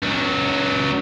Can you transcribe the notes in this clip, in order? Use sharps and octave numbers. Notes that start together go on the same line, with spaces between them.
C#2 F#3